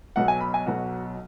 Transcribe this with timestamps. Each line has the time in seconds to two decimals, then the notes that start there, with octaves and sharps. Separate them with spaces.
0.16 B1 B2 F#3 F#5
0.28 G#5
0.41 B5
0.54 G#5
0.66 B1 B2 F#3 F#4